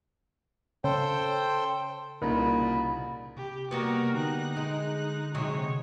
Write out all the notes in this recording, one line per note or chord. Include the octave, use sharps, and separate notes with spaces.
C#3 A4 C5 G5
C2 A#2 C#3 D#4 A#4 B5
C3 G4
G3 A#3 B3 F#4 A#4
D3 D#4 F#6
G#3
C3 F#3 G#3 C#5